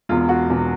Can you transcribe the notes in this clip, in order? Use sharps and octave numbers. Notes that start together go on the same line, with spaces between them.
E1 E2 B2 F4
F#4
E1 E2 B2